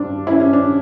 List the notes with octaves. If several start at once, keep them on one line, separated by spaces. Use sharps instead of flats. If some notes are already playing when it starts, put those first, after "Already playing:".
Already playing: G2 G3 D4
C#4 E4
C#4
D4